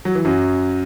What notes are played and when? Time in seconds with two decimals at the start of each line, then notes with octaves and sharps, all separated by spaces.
0.05 F#3
0.15 E3
0.25 F#2 F#3